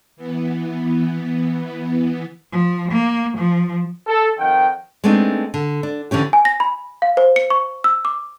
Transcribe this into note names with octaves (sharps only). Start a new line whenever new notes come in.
E3 B3
F3
A#3
F3
A4
F2 D#3 F#5 G5
G#3 A3 B3 C4 D4 D#4
D3
D4
D3 E3 C#4 G4
G#5
A#6
B5
F5
C5
C#7
C#6
E6
D6